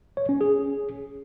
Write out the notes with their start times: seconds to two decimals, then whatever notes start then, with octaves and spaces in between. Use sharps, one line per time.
0.17 C#5
0.29 C#4
0.41 G#4